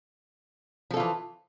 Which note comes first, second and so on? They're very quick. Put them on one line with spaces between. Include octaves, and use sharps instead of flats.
F3 A4 F4 E3